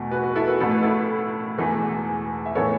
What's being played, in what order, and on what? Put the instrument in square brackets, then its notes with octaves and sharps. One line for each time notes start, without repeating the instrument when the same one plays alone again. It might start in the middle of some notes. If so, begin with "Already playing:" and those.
Already playing: [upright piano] E2 B2 A3
F#4 B4
F#4
B4
E4 A4
F#4 B4
A1 A2 A3 A4
B4
E4 A4
E1 E2 E3 A3
E5
A2 E3 B3 A4 C#5